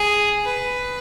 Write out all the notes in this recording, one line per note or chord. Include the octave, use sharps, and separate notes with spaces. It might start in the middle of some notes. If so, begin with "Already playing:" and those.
Already playing: G#4
B4